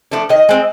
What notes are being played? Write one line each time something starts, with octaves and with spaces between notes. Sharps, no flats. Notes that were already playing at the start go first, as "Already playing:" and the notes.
F3 A3 D4
D#3 D#5
G#3 C4